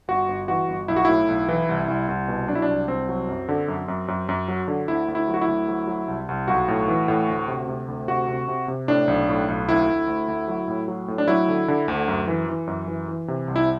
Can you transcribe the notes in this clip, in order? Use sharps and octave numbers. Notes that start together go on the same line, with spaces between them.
G1 F#4
G1
E3 F#4
G1
B1 E4
F#4
A2 E4
B1
E3
C2
C2
C2
B2
F#3 D4
E4
D4
C2
C2 C4
F#3
F#2
D3
F#2
F#2
F#2
F#2
F#3
D3
D2 E4
D2
E4
F#3
F#4
E4
D2
F#3
F#3
C2
C2
B1 F#4
A2
E3
A2
D2
C3
C3
D2
C3 F#4
C3
C3
C3
A2 D4
B1
A2
B1
D2 E4
D2
D2
D2
F#3
A2
F#3
A2
D4
F#3 E4
D3
D3
D2
F#2
E3
E3
F#2
E3
E3
C3
C2
E4